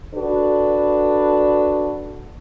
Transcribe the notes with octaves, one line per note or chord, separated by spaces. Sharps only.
D4 F#4 A4 B4